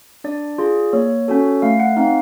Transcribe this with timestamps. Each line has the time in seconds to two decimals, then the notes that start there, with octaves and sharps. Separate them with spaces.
0.24 D4 D5
0.58 F4 G#4
0.93 A#3 C#5
1.28 C#4 F#4 A4
1.62 A3 F5
1.80 F#5
1.97 C4 D#4 F5